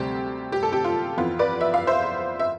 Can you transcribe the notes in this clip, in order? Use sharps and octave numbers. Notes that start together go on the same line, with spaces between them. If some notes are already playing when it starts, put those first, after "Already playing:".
Already playing: D2 C3 G3 C4 G4
G4
A4
G4
F4
F2 E3 B3 F4
B4 D5
E5
F5
C5 E5
E5